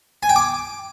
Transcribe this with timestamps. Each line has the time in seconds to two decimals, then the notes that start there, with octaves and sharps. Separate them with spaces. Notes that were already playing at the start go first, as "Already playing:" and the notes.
0.23 G#5
0.29 G5
0.36 D6